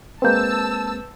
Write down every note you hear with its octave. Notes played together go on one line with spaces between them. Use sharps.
G#3 A#3 C4 B4 A5 E6 G6